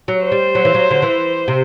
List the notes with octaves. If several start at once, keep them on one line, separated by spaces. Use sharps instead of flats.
F#3
C5
G3
F#3
E3
F#3
D3
E3
C3